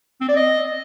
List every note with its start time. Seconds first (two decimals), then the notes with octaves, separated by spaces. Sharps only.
0.21 C4
0.29 D5
0.36 D#5